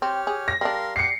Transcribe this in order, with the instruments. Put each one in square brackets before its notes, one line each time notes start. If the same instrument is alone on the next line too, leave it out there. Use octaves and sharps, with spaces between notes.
[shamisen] C4 [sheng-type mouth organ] G4 C#5 F6
[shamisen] G#4
[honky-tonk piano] A#6
[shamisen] G3 D4 [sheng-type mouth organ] A#4 F5 C6
[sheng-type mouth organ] F#5 G5 D6 [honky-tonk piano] C7 C#7